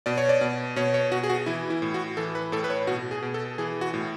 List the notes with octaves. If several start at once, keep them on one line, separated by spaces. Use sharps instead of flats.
B2 D5
C#5
D5
B2
B2 C#5
C#5
B2 F#4
G#4
F#4
E3 E4
E4
A2
F#4
E3 A4
B4
A2 A4
B4
C#5
B2 F#4
G#4
B2
A4
E3 G#4
F#4
A2